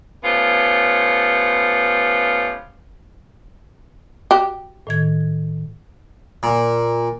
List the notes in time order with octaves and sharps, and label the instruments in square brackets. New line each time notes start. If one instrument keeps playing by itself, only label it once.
[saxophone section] A3 B3 C#4 F4 G4 C5
[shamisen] F#4 G4
[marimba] A2 D#3 G#6
[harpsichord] A#2